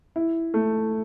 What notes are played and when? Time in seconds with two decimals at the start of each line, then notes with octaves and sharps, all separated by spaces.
0.16 E4
0.54 A3